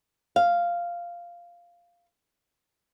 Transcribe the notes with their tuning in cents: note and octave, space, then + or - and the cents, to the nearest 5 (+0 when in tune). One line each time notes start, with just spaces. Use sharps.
F5 -5